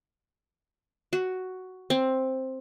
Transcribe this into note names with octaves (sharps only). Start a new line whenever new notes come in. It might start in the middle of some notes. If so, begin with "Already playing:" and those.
F#4
C4